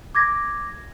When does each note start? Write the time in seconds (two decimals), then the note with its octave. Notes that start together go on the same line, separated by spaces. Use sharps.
0.15 D6 G#6 A#6